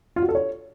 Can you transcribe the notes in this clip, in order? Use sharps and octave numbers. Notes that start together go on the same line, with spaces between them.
F4
F#4
A4
C#5